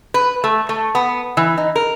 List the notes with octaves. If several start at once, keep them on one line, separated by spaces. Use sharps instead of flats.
B4
A3
A3
B3
E3
D#4
A#4